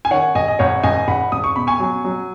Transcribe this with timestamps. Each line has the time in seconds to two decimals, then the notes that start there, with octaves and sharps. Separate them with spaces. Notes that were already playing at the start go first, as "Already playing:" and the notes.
0.05 G#5
0.11 D#3 C#5 F#5
0.35 G#1 D#5 G#5
0.48 D#5
0.59 G#1 C#5 F#5
0.83 G#1 D#5 G#5
1.08 G#1 F#5 B5
1.32 G#1 D#6
1.44 C#6
1.56 B2 B5
1.67 G#5 C#6
1.80 F#3
2.04 F#3